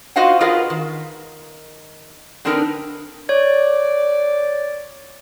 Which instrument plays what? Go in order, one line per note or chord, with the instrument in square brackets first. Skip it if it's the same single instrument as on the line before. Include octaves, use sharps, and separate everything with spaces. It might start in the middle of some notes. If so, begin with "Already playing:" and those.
[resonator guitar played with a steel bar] F4 F#4 C5 D#5 F5 F#5
F4 G#4 A#4 B4 D#5 F5
D#3
D3 C4 D4 D#4 A#4 B4
[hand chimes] C#5 G#6 [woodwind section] D5